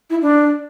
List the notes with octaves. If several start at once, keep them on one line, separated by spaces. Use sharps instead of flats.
E4
D4